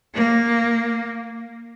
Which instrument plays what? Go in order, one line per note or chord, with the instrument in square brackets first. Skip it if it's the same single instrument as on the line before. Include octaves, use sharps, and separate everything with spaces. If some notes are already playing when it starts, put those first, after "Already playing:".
[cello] A#3